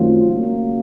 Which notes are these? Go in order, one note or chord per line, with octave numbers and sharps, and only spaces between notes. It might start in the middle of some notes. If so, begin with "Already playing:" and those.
Already playing: F#2 D#3 F#3 A3 C4 F4
C#3 F#3 A#3